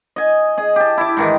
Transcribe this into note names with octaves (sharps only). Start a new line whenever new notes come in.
D#5 G#5
G#4 D#5
G4 A5
E4 D6
G#2 D#3 E3